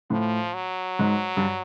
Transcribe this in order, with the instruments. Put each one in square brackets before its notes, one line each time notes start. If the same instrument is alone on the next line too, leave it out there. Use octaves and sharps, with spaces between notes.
[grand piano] A2 [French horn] F3
[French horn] F#3
[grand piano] G#2
G2